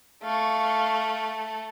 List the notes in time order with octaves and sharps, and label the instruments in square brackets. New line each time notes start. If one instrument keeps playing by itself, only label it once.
[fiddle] A3 [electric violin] F5 C#6